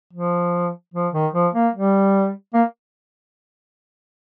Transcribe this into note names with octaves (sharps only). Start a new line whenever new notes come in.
F3
F3
D#3
F3
A#3
G3
A#3